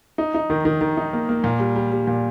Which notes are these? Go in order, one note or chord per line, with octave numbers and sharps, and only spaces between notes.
D#4
D#4
D#3
D#3
D#3
D#4
A#3
A#3
A#2
G3
G3
G3
A#2